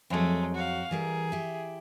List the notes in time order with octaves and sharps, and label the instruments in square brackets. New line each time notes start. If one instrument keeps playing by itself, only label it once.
[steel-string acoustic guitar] F2 F#3 [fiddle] G#3 A3
[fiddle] F#4 F5
[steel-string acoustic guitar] E3 G3 A#4 [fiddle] G#4
[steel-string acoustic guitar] E4 G4